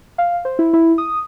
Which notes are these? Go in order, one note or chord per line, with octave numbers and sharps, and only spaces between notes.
F5
C5
E4
E4
D#6